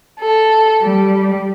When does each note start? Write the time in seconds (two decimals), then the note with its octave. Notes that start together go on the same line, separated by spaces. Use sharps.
0.20 A4
0.82 G3